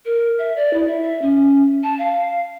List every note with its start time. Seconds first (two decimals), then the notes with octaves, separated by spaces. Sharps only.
0.05 A#4
0.39 E5
0.56 D5
0.74 E4
0.87 E5
1.02 E5
1.22 C#4
1.83 A5
1.99 F5